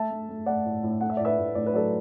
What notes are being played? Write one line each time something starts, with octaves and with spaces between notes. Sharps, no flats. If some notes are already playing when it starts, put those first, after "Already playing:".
Already playing: A3 E5 A5
A3
A3
A3 D5 F#5
A2
A2
A3 F#5
E5
A2 D5
B4 E5
A2
A2 D5
B4
F#3 A4 D5